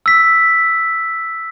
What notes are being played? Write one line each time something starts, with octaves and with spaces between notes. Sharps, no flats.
E6 B6